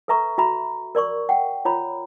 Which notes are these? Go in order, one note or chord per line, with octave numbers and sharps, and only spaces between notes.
A4 B4 E5 A#5 C#6
F#4 E5 A#5 B5
A#4 D5 C6 C#6
F#5 G5
F4 C#5 A#5 B5